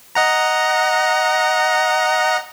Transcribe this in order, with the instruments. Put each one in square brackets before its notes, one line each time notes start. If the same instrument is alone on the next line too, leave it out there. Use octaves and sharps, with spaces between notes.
[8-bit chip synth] D#5 F#5 A#5